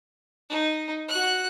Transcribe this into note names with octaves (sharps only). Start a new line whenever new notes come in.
D#4
F#4 F#6